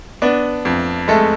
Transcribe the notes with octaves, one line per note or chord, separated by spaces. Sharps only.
B3 D4
F2
G#3 A3 A4